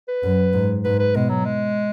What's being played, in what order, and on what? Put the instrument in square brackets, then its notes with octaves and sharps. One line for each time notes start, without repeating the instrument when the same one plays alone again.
[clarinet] B4
[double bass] F#2
G#2
[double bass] G#2 [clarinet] B4
[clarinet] B4
[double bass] B2 [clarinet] G#3
[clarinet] F#3
G#3